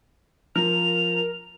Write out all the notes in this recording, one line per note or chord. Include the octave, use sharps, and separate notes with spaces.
F3 A#4 F7